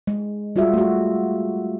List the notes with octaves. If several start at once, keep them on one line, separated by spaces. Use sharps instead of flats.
G#3
G3 F4 F#4 G#4 E5
A3 F#4